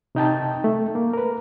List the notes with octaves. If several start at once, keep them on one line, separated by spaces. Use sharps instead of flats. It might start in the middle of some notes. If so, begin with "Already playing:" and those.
C3 D#4 G5 A5
A3
A#3
A#4 B4